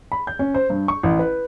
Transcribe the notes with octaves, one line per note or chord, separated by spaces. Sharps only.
B5
G6
C#4
C5
G2
C#6
A1
B4